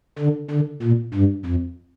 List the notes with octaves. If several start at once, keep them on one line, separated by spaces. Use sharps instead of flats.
D3
D3
A#2
G2
F2